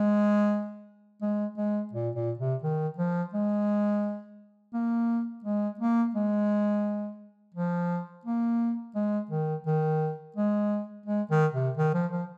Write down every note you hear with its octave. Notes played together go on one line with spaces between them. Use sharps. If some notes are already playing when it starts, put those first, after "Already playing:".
Already playing: G#3
G#3
G#3
A#2
A#2
C3
D#3
F3
G#3
A#3
G#3
A#3
G#3
F3
A#3
G#3
D#3
D#3
G#3
G#3
D#3
C3
D#3
F3
F3